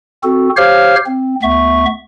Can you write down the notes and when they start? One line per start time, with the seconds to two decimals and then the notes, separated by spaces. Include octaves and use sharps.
0.23 C4 F#4 A4
0.57 G4 C5 C#5 F5 F6
1.06 C4
1.43 D2 B3 E5 C#6